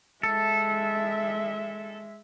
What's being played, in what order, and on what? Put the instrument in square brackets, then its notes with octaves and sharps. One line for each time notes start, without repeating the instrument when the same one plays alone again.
[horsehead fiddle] G#3 E5 [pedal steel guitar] A4